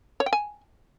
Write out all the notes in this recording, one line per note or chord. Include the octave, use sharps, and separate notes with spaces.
C#5
G5
G#5